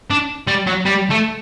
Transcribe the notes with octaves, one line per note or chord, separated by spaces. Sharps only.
D4
G3
F#3
G3
A3